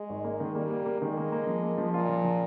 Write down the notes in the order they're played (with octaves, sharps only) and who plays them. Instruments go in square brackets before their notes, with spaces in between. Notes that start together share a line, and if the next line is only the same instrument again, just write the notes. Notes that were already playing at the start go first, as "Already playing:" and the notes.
Already playing: [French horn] G#3
[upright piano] G#1
A#3
D#3
[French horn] G3 [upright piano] A#3
[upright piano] A#3
A#3
[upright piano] D#3 [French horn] G#3
[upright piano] A#3
A#3
F3
A#3
F3
[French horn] A#2 [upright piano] F4
[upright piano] F3
F3